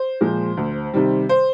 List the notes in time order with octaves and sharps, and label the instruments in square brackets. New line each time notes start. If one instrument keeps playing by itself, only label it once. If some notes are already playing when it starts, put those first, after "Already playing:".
Already playing: [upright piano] C5
A#2 F3 G#3
D2
C3 D#3 G3
C5